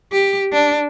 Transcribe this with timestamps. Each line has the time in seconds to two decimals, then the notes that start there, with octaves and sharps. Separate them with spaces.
0.12 G4
0.52 D4